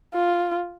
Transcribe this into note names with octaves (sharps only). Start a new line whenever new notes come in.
F4